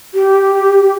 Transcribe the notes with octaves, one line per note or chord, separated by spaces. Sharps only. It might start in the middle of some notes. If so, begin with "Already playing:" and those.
G4